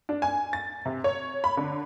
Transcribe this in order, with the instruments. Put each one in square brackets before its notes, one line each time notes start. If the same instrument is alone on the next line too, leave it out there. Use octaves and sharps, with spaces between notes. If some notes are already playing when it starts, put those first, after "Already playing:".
[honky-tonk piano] D4
G#5
A6
C3
C#5
B5
D3